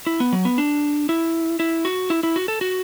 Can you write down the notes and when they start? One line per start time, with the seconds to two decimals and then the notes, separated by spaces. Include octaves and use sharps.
0.07 E4
0.20 B3
0.33 F#3
0.45 B3
0.58 D4
1.09 E4
1.60 E4
1.85 F#4
2.10 E4
2.23 E4
2.36 F#4
2.48 A4
2.61 F#4